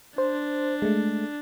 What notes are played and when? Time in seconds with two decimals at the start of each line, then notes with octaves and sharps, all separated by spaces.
0.18 D4 C5
0.82 G#3 A3